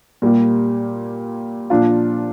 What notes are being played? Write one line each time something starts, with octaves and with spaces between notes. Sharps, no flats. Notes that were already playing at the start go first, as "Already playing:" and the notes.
A#2 G3 A#3 G4
A#2 F3 D4 F4